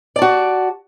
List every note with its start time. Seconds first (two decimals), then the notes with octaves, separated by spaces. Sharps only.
0.16 D5
0.19 A5
0.22 F#4